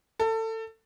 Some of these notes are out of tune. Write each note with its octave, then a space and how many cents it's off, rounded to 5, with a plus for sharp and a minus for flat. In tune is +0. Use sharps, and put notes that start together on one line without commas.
A4 +25